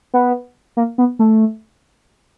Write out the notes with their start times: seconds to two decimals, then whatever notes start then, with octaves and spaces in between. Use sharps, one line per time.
0.14 B3
0.77 A#3
0.98 B3
1.19 A3